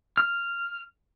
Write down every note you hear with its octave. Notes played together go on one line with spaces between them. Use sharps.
F6